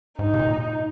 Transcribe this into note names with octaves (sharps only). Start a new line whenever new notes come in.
G#2 D#4
C3
A#2